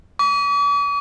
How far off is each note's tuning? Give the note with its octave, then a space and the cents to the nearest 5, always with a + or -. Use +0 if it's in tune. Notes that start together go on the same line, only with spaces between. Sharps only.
D6 -45